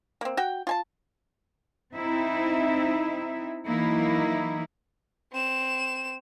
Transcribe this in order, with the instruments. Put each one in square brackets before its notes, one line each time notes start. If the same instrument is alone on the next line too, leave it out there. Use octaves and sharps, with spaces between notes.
[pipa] A#3 C4
F#4 G5
F4 G#5 A5
[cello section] C4 D#4 E4 E5
E3 F#3 A#3 D#4 E4
[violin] C4 E7